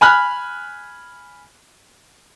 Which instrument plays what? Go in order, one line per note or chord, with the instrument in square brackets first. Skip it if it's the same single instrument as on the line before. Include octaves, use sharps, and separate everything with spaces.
[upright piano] G#5 B5 F6 F#6